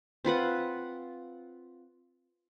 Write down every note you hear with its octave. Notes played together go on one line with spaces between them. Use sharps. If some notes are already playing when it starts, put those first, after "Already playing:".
C4 F4 B4 F#5